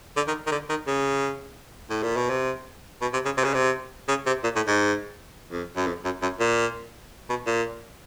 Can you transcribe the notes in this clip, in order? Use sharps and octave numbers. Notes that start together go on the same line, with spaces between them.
D3
D#3
D#3
D3
D#3
C#3
A2
A#2
B2
C3
B2
C3
C#3
C3
C#3
C3
C#3
C3
A#2
A2
G#2
F2
F#2
F2
F#2
F#2
A#2
B2
A#2